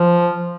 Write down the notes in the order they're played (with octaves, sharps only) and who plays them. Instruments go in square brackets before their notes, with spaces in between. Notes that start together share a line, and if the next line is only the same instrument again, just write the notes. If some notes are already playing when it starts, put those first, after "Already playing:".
Already playing: [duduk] F3